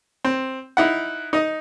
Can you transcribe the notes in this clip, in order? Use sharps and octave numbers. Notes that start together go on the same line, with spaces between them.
C4
D#4 E4 F#5
D#4 D#5